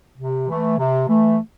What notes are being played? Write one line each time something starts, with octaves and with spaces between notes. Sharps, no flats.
C3
E3 A3
C3
E3 A3